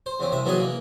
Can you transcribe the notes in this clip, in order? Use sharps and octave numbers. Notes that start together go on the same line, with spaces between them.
C5
E2 C#3 C4
C2 C3 E5
E3 F#3 B3 D4 G#4 D#5
E3 A#3